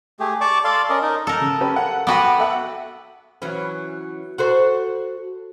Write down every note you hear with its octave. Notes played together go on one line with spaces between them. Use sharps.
A3 G4 G#4
D5 A5 C#6 D6
A4 D5 F5 C6
C#4 A#4 D5 D#5
D#4 A#4 D#5
A4 A#4
C#3
C#4 G4 B4
F#5
B3 F#4 B4 G5 D6 D7
A4 E5 F#5
E3 F#3 C#4
F#4 A4 C5